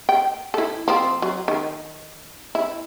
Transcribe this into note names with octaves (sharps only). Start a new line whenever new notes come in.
G5
E4 A4
F3 C4
F#3
D#3
E4